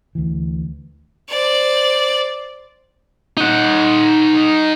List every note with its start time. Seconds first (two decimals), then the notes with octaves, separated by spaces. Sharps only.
0.15 D2 E3
1.29 C5 D5
3.37 D#4 F#5